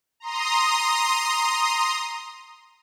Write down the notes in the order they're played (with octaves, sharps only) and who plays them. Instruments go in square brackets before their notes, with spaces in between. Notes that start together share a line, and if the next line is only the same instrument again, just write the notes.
[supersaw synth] A#5 C6 D#6